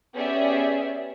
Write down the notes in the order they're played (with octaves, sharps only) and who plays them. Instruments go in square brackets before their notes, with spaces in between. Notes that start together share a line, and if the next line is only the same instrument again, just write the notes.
[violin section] B3 C#4 G4 G#4 D5 E5